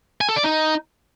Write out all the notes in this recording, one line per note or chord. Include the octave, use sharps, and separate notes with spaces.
G#5
A4
D5
D#4